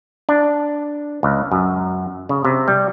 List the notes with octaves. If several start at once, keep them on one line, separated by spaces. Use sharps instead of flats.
D4
C#2
F#2
C#3
C3
G3